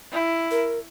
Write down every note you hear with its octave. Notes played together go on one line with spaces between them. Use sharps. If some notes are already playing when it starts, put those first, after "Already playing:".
E4
A#4